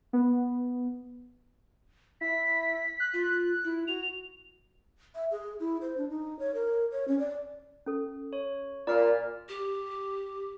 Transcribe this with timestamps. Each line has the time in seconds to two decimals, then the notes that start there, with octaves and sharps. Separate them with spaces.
0.13 B3
2.21 E4 B6
3.00 F#6
3.13 F4
3.64 E4
3.88 F#4 F7
5.15 E5
5.31 G#4
5.60 E4
5.81 C5
5.97 D4
6.09 D#4
6.39 C#5
6.54 A#4
6.92 C#5
7.08 C#4
7.19 D5
7.86 C#4 A4
8.33 C#5
8.87 A#2 F4 D5 F6
9.49 G4